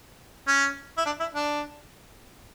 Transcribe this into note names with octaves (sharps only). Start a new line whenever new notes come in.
C#4
E4
D4
E4
D4